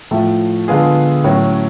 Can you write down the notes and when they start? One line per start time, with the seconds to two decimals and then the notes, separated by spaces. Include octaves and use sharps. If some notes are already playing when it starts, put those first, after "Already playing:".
0.11 A2 F3 A3
0.68 D3 G#3 B3 F4 G#4
1.24 A2 F#3 C#4